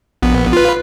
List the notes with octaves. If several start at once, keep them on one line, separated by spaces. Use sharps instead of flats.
A#1 B3
F4 B4